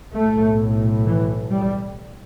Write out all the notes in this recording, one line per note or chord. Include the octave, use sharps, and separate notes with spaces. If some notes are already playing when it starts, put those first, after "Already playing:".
B1 A2 A3
E3
G3